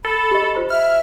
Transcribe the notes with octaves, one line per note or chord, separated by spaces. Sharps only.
A4 B5
G4 D#5
F4 C5 B5
E5 F6